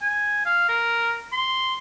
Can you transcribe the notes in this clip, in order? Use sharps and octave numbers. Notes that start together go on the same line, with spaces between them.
G#5
F5
A#4
C6